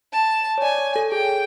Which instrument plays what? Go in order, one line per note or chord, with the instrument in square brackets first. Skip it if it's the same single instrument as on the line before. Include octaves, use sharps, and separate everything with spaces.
[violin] A5
[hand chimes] C#5
[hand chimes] D5 [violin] G#5
[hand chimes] C#5
A4
[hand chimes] G#4 [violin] G5